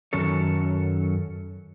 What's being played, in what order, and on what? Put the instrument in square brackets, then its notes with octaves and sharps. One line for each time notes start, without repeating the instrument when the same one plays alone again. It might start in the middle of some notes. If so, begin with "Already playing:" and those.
[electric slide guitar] F#2 D#3 F#3 C#4 A4 C#5